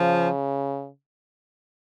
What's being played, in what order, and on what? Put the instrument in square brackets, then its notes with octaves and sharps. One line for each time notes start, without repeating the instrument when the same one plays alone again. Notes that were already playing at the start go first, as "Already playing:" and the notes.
Already playing: [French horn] C#3 [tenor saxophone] F3